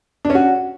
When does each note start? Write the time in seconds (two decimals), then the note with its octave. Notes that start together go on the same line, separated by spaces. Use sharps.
0.25 D4
0.30 C#4
0.35 F#4